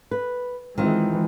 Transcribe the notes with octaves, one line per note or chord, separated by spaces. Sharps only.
B4
D#3 E3 G#3 C4 F4